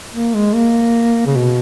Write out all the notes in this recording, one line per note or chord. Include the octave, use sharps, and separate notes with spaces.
A#3
G#3
A#3
C#3
B2